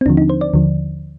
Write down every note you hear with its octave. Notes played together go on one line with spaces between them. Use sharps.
C4
D#2 D3 F3 D4
D#4
C5
D5
D#2 D3 F3